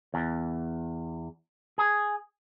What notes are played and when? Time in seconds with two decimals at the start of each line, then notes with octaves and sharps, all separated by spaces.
0.14 E2
1.78 G#4